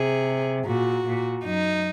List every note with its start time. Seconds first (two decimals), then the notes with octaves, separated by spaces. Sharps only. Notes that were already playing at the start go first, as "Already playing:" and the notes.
Already playing: C3 G#4
0.67 A#2 F#4
1.07 A#2
1.45 F#2 D#4